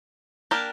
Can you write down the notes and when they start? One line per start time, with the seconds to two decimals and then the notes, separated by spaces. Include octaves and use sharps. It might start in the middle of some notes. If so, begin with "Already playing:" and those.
0.51 A#3 D4 G4 A#4